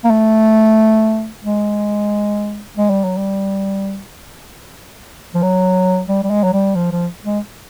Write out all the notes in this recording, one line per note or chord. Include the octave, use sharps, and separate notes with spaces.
A#3
A3
G#3
G#3
G3
F#3
G3
F3
F#3
G3
G3
G#3
F#3
G3
F3
F3
G#3